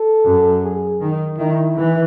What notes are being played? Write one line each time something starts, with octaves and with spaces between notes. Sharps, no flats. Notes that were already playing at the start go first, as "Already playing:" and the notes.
Already playing: A4
F#2
G#4
D#3
D#3 E4
E3